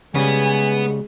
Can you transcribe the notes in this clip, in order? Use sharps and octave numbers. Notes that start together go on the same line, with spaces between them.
C#3 G3 G#3 B3 G#5